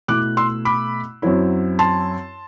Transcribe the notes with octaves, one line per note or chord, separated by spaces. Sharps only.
B2 A3 E4 D6 F#6
C6 E6
B5 D6
F#2 F#3 C4 E4
A5 C6